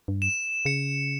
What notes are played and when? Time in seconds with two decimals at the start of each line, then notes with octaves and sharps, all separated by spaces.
0.08 G2
0.22 E7
0.65 C#3 C#7